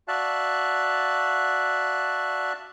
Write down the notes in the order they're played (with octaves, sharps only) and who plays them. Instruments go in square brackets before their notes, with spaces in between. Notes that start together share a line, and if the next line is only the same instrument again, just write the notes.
[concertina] F#4 D5 E5 F5 A5 F#6